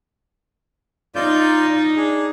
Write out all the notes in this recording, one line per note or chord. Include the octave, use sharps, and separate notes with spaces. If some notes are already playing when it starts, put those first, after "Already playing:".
D#4 F4 D5 G6
D4 G#4